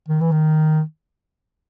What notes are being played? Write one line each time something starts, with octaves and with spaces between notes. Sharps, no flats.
D#3
E3
D#3